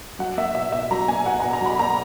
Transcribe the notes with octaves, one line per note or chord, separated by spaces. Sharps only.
F#3 F#5
A#3 E5
B2 E5
B2 E5
F#3 A#5
A#3 G#5
B2 F#5
B2 A#5
A#5
F#3 B5
A#3 A#5